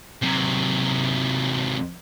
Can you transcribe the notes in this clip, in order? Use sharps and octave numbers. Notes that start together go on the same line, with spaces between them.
C3 F#3